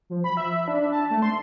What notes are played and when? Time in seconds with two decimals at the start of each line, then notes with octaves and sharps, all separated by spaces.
0.10 F3
0.24 B5
0.37 E5
0.68 D4
0.92 A5
1.11 A3
1.22 C6